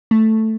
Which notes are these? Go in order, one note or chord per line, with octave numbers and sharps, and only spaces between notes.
A3